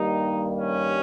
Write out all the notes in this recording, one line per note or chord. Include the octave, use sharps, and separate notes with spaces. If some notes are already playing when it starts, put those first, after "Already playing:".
Already playing: G2 D#3 G3 A#3 D#4
C#4